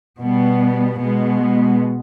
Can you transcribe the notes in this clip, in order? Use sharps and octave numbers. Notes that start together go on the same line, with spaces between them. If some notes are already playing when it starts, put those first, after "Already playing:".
B2 G3 B3
B2 G#3 B3